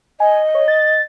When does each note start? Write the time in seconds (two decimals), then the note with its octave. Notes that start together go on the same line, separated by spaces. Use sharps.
0.20 D#5 G#5
0.55 C#5
0.68 A6